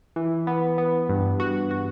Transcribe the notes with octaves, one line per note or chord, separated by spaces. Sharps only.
E3
B3
B3
G2
F#4
F#4